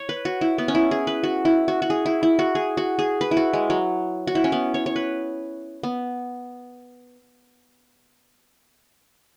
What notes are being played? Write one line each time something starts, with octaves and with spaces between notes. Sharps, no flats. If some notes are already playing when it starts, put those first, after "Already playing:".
Already playing: C#5
B4
F#4
E4
B3
C#4
E4
G#4
B4
F#4
E4
F#4
F#4
G#4
E4
E4
F#4
G#4
F#4
G#4
B4
E4
F#4
G#3
F#3
F#4
E4
C#4
B3
C#5
C#5
B4
B3